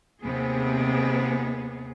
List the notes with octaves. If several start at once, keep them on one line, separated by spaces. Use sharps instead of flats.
D#2 C3 B3 G#4